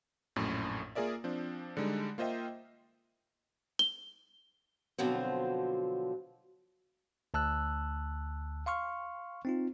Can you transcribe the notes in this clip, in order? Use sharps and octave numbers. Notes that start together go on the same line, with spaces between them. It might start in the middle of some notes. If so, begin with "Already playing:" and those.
A#1 F#2 A2 A3
A#3 F4 G#4 A#4 D5 E5
F3 C4 D4
D3 G3 G#3 D#4
A#3 F4 C5 D#5 E5 G5
G7
B2 D3 F3 F#3 C4
D2 A5 E6 F#6
F5 C6 C#6 F6
C4 D#4 F4